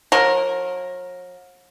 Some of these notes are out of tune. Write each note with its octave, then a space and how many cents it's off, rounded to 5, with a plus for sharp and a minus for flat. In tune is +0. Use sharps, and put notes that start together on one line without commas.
F#3 -45 A#4 +0